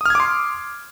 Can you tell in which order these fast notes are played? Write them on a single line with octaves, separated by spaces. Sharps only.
D#6 F6 G#6 D6 C6